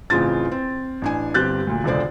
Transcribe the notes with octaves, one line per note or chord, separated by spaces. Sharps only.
A1 C#3 C4 F4 A6
C4
A1 D4 G#5
G1 C4 G4 F#6 G6 A6
D2 A#2
E1 C#2 D3 C5 D5